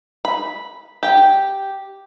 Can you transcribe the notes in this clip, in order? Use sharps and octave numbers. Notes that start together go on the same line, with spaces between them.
B5
G4 G5